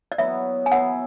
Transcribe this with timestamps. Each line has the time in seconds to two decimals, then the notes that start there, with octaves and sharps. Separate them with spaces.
0.12 D5
0.18 F#3 B3 E4 E5
0.66 G#5
0.72 F#3 B3 E4 F#5